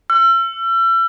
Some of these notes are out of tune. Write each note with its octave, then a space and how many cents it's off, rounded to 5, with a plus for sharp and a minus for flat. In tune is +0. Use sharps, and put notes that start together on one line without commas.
E6 +40